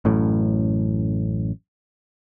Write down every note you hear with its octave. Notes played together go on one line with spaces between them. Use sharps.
A1 F#2 A2